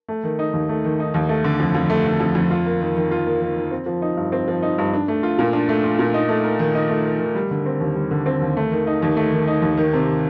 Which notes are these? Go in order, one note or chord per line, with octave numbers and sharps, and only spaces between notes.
A3
D#3
D#4
D#2
A3
D#3
D#4
D#2
A3
D3
F2
F2
A3
D3
F2
F2
F4
A#3
D#3
D#3
F4
A#3
D#3
D#3
C4
F3
D#4
G2
C4
F3
D#4
G2
D4
A3
F4
A#2
D4
A3
F4
A#2
D#4
A3
A#4
D#3
D#4
A3
A#4
D#3
G3
D3
C4
D#2
G3
D3
C4
D#2
A3
D#3
D#4
D#2
A3
D#3
D#4
D#2
D#3
C3